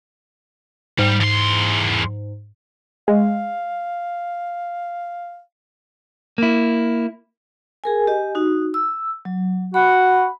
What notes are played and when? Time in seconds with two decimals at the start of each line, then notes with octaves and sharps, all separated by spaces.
0.99 G#2 G3
1.20 E2 C6
3.08 G#3 F5
6.38 A#3 E4
7.84 G#4 A#4 G#5
8.07 G4 D#5 G#5
8.35 D#4 F#4
8.74 E6
9.25 F#3
9.74 F#4 F#5 B5